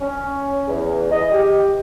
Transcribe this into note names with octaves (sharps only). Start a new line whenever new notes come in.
C#4
E2
D#5
G4